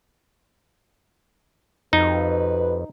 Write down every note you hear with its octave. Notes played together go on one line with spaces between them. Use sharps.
F2 C3 D#4 F#4 B4